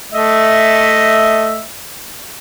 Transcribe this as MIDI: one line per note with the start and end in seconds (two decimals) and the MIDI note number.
0.12 1.63 57
0.12 1.63 75
0.12 1.63 76